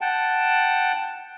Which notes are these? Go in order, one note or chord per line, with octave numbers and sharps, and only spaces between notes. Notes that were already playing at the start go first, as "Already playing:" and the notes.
F#5 G5 A5